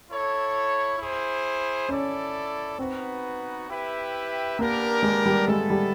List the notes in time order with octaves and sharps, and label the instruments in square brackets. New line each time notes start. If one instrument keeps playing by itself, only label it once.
[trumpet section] E4 A4 C#5
E4 G#4 C5
[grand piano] C#4 [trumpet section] E4 A4 D5
[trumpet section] B3 D#4 F#4 B4 [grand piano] C4
[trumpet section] E4 G4 B4 E5 G5
[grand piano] A#3 [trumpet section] B3 D4 G4 A#4
[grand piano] G#3
G3
[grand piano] G#3 [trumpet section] B3 E4 A4
[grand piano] G3